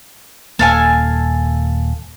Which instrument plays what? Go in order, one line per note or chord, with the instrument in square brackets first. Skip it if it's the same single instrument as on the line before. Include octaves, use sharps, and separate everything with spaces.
[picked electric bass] D#1 A#3 [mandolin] A4 F5 G#5